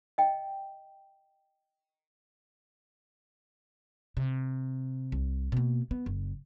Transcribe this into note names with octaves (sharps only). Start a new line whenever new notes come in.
D#5 G5
C3
C2
B2 A#3
B3
F#1